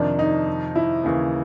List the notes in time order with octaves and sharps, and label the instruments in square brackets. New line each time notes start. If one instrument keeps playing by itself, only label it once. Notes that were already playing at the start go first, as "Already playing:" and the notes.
Already playing: [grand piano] F2 C3 D#3 [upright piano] D4
[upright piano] D#4
E4
[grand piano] D#2 C#3 E3